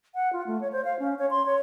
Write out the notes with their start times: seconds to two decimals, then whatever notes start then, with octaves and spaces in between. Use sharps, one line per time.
0.15 F#5
0.33 F4
0.47 A3
0.61 C#5
0.72 C5
0.85 F5
0.99 C#4
1.19 C#5
1.30 C6
1.46 C#5